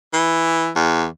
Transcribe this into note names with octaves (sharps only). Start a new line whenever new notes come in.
E3
E2